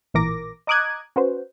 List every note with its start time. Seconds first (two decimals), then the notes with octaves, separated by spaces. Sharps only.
0.14 A1 A#2 E3 A#4 D6 A#6
0.67 D#5 A#5 D6 D#6 F#6 G#6
1.16 C#4 F#4 B4 C5